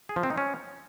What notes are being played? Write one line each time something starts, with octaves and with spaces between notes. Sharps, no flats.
G#4
F3
C4
D#4
C#4